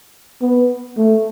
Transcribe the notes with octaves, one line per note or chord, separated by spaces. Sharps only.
B3
A3